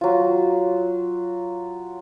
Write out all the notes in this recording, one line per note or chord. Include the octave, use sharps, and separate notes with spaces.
F#3 F4